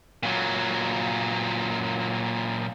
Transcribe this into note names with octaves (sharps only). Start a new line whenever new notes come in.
A#2 F#3